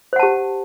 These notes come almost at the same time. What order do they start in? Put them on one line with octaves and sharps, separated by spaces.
C5 F#5 A5 G4